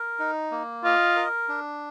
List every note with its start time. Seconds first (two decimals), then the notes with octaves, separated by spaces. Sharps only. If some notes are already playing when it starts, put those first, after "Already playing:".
Already playing: A#4
0.19 D#4
0.51 A#3
0.84 F4 D#5
1.16 A#4
1.49 D4